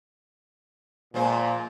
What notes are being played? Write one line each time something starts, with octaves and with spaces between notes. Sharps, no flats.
A#2 F3 G#3 C5